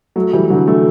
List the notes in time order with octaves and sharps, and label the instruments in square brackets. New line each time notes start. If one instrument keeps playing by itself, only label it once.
[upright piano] F#3 A3
E3 G3
D3 F#3
F#3 A3